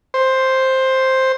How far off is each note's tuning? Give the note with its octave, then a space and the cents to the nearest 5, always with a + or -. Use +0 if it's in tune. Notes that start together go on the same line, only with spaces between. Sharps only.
C5 +5